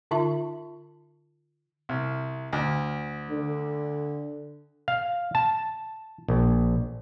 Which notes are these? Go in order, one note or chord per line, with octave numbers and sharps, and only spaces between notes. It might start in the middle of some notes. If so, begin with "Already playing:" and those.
D3 D#4 F4 E5 A5
C2
D2
D3
F5
A5
A#1